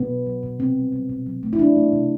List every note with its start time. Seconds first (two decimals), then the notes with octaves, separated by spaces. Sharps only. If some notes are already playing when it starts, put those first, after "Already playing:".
Already playing: B2 B3
0.09 F#3
0.26 F#3
0.43 B2
0.59 C3 C4
0.76 G3
0.92 G3
1.09 B2
1.26 F#3
1.43 A3
1.53 E4
1.59 A3 D4
1.76 A3
1.92 C3